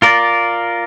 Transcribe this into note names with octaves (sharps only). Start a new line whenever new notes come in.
F4 A#4 D5